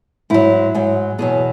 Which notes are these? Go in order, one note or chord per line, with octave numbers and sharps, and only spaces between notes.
G#2 F#3 E4
G#2 F#3
E2 B2 F#3 G#4